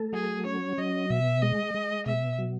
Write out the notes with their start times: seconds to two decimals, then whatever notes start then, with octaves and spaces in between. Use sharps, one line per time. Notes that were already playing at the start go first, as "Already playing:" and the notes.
Already playing: A3 A4
0.13 F#3 G#4
0.46 C#4 C#5
0.78 F#3 D#5
1.10 B2 E5
1.42 G#3 D#5
1.74 G#3
2.06 B2 E5
2.38 F#3